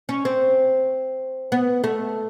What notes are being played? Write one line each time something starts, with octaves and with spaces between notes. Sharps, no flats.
C#4
C4
B3
A3